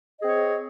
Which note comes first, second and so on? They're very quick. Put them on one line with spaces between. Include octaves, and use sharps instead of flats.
D#5 G#4 C4 C#5